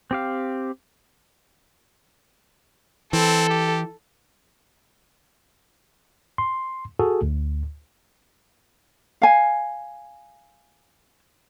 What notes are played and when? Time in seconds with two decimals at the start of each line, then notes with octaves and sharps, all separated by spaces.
0.11 C4 G4 F5
3.13 E3 C4 A4
3.50 G4
6.38 C6
6.99 F#4 G#4 A4
7.21 D2
9.22 F5 G#5